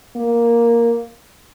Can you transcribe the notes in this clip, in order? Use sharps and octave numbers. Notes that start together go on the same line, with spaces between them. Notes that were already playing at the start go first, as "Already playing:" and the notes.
A#3